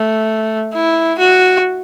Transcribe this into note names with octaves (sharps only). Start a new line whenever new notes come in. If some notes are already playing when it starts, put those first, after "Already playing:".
Already playing: A3
E4
F#4